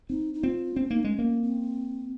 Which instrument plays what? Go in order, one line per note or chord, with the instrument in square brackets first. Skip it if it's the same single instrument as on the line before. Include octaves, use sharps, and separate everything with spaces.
[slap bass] C4 [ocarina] D#4
[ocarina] D#4
[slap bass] C4 [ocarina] F4
[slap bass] C4 [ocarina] C#4
[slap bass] A#3 [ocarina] D#4
[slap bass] G#3 [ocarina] C#4
[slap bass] A#3
[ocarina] C4